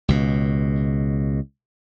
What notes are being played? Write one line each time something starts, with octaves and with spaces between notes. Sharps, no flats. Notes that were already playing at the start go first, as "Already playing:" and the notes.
C#2 B2